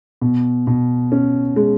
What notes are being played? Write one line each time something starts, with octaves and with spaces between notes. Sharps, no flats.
B2
B2
C#4
G#3